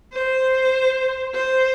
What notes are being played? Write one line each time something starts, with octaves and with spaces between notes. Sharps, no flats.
C5
C5